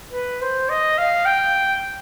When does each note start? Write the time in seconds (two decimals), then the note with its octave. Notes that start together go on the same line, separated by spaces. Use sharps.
0.13 B4
0.41 C5
0.69 D#5
0.98 F5
1.25 G5